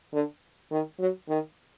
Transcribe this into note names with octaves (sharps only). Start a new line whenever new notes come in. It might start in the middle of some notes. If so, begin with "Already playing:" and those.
D3
D#3
F#3
D#3